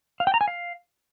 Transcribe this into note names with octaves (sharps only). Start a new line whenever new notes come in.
F5
G5
A#5
G#5
F5